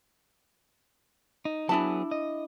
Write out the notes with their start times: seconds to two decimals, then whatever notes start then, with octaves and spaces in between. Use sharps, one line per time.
1.45 D#4
1.69 F#3 B3 D4 E4 G#4 A5
2.11 D#5